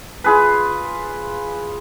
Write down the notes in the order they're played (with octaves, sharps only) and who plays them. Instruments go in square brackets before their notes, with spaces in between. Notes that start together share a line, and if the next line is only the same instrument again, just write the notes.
[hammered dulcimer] F4 G#4 B4